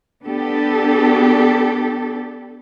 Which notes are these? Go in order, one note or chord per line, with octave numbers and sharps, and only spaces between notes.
B3 D4 G4 A4